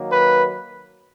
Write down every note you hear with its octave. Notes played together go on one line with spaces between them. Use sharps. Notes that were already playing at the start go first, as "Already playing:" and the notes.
Already playing: D#3 F#3 A#3
B4